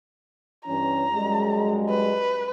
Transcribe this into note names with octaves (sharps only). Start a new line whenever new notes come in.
G2 E3 C#4 A#5
F#2 G3 G#3
B4